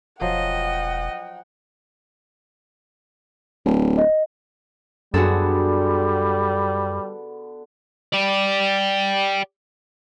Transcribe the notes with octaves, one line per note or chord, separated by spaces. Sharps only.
E1 F3 F#3 D#5 F#5 G5
D1
D#5
F#2 D3 G3 B3 F#4 G#4 A4
G4 D5